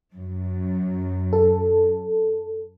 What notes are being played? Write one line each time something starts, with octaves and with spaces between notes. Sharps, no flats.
F#2
A4